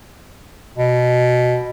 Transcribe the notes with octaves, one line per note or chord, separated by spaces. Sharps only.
B2